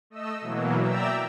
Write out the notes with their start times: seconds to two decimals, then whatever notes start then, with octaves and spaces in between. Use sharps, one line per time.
0.10 A3 D#5 E6
0.41 B2 E3 F#3 A#3
0.80 D5 E5 G5 A#5 E6